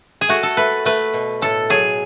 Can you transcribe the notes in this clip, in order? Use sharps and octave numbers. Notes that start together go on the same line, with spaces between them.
G#4
A3 F#4
A4
A3 B4
A3 B4
B2
A2 A4
F#3 G#4